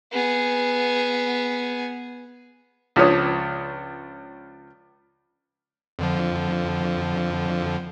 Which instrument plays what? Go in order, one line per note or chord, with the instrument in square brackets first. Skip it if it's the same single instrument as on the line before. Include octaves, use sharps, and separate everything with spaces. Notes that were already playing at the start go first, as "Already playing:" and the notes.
[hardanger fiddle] B3 G#4
[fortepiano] C#2 F3 D4 C#5 D#6
[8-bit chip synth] F2 D3 F3